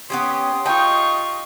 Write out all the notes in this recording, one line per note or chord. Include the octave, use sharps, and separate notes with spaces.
B3 C#4 G4 C6 D#6
D#4 F4 G4 G#4 G5 C#6